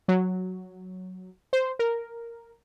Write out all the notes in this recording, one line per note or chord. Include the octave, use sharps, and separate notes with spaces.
F#3
C5
A#4